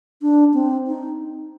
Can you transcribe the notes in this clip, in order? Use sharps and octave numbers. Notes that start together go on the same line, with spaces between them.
D4
C4
D#4